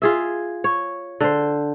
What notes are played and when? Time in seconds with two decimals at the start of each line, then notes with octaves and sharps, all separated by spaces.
0.02 F4 G#4 E5
0.64 C#5
1.21 D3 C5